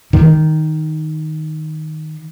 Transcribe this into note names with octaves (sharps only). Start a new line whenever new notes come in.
D#3